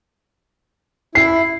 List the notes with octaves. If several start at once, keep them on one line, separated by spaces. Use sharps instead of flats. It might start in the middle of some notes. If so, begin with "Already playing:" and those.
E4 C7